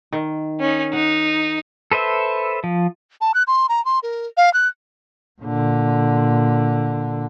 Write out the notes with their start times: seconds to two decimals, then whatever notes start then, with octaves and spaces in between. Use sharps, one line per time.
0.13 D#3
0.60 C#4 D#4
0.93 D#4 F#5
1.92 A4 B4 C5 E5
2.64 F3
3.21 A5
3.34 F#6
3.47 C6
3.69 A#5
3.85 C6
4.03 A#4
4.37 F5
4.54 F#6
5.41 A#2 D3